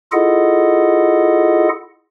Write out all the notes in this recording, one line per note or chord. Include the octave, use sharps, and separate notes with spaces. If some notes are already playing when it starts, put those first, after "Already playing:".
E4 F4 G#4 A4 D#5 F#5